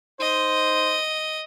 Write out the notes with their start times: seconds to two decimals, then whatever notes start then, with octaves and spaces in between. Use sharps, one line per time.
0.20 D#4 C5 D#5